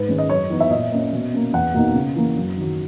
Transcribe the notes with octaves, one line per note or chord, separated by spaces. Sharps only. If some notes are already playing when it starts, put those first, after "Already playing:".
Already playing: G#2 B4
D#3 G#3 C#4
D#5
F#2 C#5
E3 B3 D#4
E5
A#2 D#5
A#3 C#4
B2
A#3 C#4
E2 F#5
B2 A#3 D#4
C#3
E3 A#3
F#2
D#3 F#3